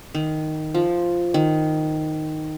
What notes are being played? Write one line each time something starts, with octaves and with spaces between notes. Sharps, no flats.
D#3
F3
D#3